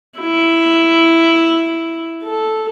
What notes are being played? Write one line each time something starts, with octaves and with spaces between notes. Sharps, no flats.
E4
A4